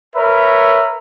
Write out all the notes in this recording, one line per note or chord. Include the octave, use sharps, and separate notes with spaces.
A#4 B4 C#5 E5 B5